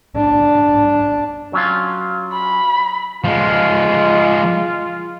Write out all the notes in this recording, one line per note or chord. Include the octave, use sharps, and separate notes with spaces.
D4
F#3 C#4 F4
B5
F3 G#3 F4